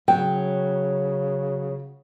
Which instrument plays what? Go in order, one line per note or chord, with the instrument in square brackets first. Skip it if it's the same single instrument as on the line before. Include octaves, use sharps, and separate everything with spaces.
[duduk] C#3 [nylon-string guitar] F#3 [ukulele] G5